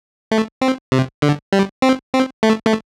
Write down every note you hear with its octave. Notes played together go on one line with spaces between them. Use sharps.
A3
C4
C3
D3
G3
C4
C4
A3
A3